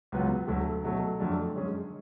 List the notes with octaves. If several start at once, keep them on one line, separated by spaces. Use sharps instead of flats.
C#2 C#3 F#3 B3 F4
D2 D3 F#3 A3
B2 F#3 A3
F2 D3 F#3 A3 D4
F#2 D3 G#3 C#4 G#4